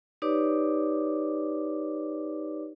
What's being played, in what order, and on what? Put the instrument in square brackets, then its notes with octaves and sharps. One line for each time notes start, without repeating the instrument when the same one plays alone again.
[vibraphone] D#4 G4 B4 C#5 D5 D6